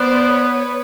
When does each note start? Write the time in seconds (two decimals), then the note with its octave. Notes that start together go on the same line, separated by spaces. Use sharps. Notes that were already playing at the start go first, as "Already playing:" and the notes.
Already playing: B3 C5 D5
0.31 B4 C#5